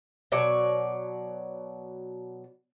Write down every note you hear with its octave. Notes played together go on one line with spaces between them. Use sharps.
B2 F#3 C#5 D5